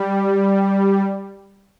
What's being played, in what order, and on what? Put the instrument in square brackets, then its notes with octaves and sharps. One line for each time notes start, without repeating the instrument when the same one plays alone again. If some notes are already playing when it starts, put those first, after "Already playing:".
Already playing: [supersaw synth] G3